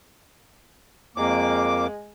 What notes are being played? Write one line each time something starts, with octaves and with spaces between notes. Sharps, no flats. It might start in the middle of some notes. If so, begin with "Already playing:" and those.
F2 G#3 A#3 D6